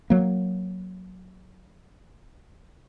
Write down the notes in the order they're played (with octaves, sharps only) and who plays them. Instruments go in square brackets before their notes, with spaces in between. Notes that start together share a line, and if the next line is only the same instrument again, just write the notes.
[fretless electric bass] F#3 A#3